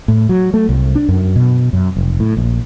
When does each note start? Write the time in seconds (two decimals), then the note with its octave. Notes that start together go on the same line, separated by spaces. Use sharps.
0.08 A2
0.29 F#3
0.54 A3
0.69 C2
0.95 D4
1.09 F#2
1.36 B2
1.73 F#2
1.96 F1
2.20 A2
2.37 A#1